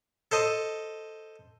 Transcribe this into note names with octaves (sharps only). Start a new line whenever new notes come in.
A4 C5 D#5